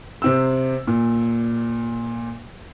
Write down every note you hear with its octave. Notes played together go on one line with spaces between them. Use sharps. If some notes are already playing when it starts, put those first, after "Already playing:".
C3 C4 E6
A#2